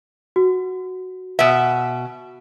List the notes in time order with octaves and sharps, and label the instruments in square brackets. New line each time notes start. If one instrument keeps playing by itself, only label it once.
[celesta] F#4
[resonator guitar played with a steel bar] B2 E5